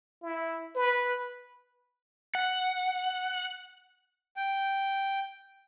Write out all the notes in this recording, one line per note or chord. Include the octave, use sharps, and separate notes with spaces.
E4
B4
F#5
G5